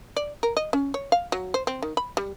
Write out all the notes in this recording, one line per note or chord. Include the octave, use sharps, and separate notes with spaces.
D5
A#4
D#5
C#4
C#5
F5
F#3
C5
C4
D#3
B5
G3